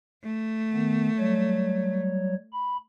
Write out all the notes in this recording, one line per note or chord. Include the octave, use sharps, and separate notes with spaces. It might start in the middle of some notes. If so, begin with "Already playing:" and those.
A3
D#3 B3
F#3 G3 C#5
B5